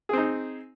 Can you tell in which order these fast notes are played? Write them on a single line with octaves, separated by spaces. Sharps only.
G#4 C4 D#4